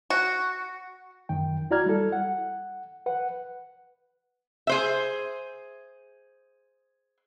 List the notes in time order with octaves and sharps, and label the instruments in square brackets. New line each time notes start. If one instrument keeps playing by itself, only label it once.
[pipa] F#4
[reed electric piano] F#2 D#3 G5
E4 F#4 D5 A#5 F6 G#6
G3 E4 A4
F#5
B4 F#5
[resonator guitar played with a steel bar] G#4 C5 E5